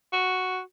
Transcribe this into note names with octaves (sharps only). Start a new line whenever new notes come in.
F#4